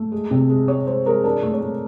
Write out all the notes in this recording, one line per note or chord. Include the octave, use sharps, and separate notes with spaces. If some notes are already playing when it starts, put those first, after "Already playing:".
Already playing: A3
G#3
C3
G#3
G#3 C#5
G#3 C5
G#3 A#4
D4 A#4
A3
C#5
A3